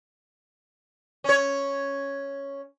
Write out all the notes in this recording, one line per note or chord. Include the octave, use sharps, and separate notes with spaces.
C#4 C#5